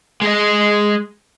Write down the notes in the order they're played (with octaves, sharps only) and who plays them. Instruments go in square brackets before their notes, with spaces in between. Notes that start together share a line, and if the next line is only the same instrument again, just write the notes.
[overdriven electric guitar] G#3 D#5